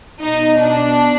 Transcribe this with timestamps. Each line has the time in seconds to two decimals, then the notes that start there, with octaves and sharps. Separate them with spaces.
0.21 B2 D#4
0.60 D4